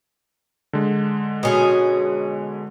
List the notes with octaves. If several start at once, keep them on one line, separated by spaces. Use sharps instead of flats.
D3 G#3
B2 C#4 G#4